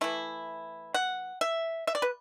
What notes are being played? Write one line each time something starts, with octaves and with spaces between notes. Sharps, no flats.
E3 A3 E4
F#5
E5
E5
D5
B4